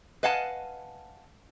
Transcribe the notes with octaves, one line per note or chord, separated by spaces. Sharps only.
B4 D#5 F5 F#5 G#5 A5